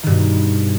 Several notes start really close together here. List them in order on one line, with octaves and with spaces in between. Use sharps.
D#3 G2 B2